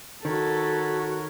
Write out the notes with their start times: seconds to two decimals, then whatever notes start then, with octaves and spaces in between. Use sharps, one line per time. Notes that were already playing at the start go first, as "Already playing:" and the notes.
0.25 D#3 F#4 A4 A#4 C#5 B5